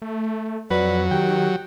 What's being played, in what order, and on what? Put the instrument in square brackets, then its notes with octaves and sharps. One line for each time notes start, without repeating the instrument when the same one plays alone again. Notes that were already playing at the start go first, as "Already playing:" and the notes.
[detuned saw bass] A3
[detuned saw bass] F2 [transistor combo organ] F#3 [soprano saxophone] B4 [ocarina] D5
[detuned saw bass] D#3 [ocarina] G4 [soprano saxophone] G5